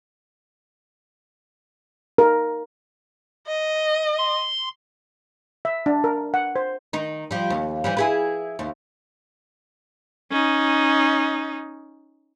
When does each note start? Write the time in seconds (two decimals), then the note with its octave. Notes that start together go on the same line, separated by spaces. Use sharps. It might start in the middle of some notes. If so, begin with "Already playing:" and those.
2.18 A#4
3.47 D#5
4.18 C6
5.65 E5
5.86 D4
6.04 A#4
6.34 F#5
6.56 C5
6.93 D#3 D#4
7.31 F3 G3
7.50 D#2
7.84 E3 F3 G3
7.97 E4 G#4 B4
8.59 D#2
10.31 C#4 D#4